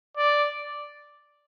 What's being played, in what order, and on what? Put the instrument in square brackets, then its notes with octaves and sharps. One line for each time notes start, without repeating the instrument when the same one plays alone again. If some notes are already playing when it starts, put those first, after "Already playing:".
[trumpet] D5